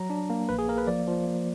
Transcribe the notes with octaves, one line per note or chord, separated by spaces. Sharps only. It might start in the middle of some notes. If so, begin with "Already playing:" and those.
Already playing: F#3 A#5
D4
A#3
A#1 B4
G#4
A#3 A#4
B4
F3 D5
F3
A#3